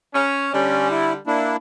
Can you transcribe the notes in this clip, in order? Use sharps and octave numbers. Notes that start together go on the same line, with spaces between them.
C#4
D3 G3 C#4
E4
A#3 D4 E4